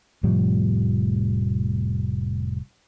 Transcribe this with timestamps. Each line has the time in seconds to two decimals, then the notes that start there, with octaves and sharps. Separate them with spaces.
0.23 F1 A2 F3 G3